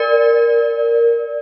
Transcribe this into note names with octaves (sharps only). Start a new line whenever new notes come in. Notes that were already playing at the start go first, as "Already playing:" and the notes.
Already playing: A#4 D5